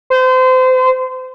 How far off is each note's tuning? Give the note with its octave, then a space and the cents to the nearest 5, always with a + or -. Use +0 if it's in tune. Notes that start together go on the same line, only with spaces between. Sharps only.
C5 -30